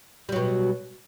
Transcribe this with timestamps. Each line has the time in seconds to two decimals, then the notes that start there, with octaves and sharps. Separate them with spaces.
0.29 G3
0.32 F#3
0.36 B2